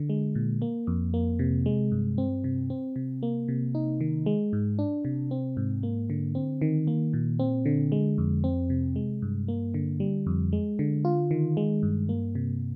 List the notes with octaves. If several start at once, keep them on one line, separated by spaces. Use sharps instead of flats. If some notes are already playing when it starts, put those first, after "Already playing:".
Already playing: D3
G#3
A#2
A#3
F2
A#3
C3
G#3
G2
C4
C3
C4
C3
A#3
C3
D#4
D#3
G#3
G#2
D4
C3
C4
G#2
A#3
D3
C4
D#3
A#3
A#2
C4
D3
G#3
F2
C4
C3
G#3
G2
A#3
D3
G3
F2
G#3
D3
F4
D#3
G#3
G2
A#3
C3